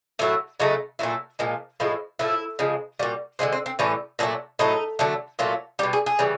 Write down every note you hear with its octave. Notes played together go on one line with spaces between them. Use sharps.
A2 F#3 A3 E4
C#3 F#3 A3 D#4
A#2 F#3 A3 E4
A#2 F3 G#3
A2 F3 G#3 E4
A2 F3 A3 E4
C#3 F3 G#3
A#2 G3 F#4
D3 F3 G#3 C4
C4
C4
A2 E3 G3 C#4
A#2 F#3 A3 D4
A2 F#3 A3 D#4
D3 F#3 A3
A#2 F#3 A3 F4
B2 G3 G4
G#4
G#4
C#3 E3 G3